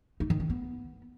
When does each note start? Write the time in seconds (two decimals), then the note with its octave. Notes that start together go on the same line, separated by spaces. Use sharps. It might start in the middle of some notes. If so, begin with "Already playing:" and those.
0.20 D#4
0.30 D#3
0.40 C#4
0.50 B3